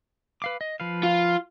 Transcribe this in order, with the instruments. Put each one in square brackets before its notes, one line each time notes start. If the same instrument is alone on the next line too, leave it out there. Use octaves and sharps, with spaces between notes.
[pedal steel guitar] B4 F5 D6
D#5
F3 B4 F5
[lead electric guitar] F4